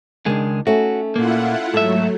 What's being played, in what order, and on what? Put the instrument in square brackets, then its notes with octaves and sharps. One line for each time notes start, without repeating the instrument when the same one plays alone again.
[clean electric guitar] C#2 G#3 G#4 [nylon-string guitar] D#3 D4
[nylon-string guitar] A3 C#4 D#4 [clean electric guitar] F#4
[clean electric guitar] A#2 A#3 [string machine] E4 F4 F#5
[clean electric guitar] G#2 E5 [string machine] F#3 A3 [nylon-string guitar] A4